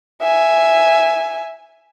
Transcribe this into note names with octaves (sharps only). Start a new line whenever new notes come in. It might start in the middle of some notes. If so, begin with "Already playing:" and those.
E5 G#5